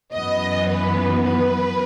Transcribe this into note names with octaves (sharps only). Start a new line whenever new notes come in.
F#2 E3 B3 D#5
B4
B4